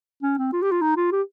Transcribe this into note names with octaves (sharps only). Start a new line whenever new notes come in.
C#4
C4
F4
G4
F4
D#4
F4
G4